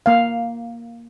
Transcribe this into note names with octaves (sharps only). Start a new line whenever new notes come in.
A#3 F5